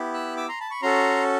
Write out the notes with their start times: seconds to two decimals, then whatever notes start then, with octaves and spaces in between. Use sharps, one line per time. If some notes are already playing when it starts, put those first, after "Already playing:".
Already playing: B3 E4 G4
0.14 E6 F#6
0.37 D6 E6
0.49 A#5 C6
0.60 A5 B5
0.71 B5 C#6
0.82 C#4 F#4 A4 A#5 C6